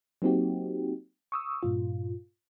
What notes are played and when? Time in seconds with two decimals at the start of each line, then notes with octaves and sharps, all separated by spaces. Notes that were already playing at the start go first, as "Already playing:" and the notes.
0.22 F#3 A#3 C4 D#4 F#4 G4
1.32 C#6 D#6 E6
1.63 G2 A#2 F4